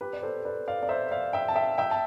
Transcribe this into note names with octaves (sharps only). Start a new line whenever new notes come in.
G4 B4
D5
A4 C5
B4 D5
D5 F5
D5
C5 E5
D5 F5
E5 G5
A5
E5 G5
E5 G5
A5